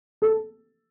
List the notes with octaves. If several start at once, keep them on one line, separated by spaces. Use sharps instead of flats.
A4